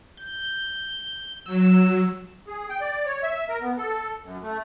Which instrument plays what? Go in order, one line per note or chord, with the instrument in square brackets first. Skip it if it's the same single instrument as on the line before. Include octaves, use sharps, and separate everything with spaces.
[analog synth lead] G6
[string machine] F#3 [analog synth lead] E6
[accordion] G#4
G5
D5
C#5
E5
A#4
B3
A4
F#2
A3